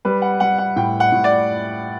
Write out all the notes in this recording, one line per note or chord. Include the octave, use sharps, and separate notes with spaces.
G3 B4
F#5
G3 F#5
F#5
A2 G5
F#5
A2
D5